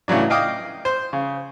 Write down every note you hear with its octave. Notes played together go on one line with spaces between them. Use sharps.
A2 C#3 E3 F#3 D4
D#5 F5 G5 D6 D#6
C5
C#3